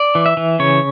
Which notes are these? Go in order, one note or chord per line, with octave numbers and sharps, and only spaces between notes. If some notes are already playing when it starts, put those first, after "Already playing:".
Already playing: D5
E3
E5
E3
C#3 C#5